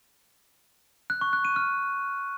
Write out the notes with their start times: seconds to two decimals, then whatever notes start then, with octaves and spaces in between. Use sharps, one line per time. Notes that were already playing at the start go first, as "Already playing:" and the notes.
1.10 F#6
1.21 C#6
1.33 F#6
1.45 D#7
1.56 F6